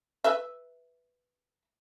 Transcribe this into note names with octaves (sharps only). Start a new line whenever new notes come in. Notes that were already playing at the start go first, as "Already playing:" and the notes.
B4 E5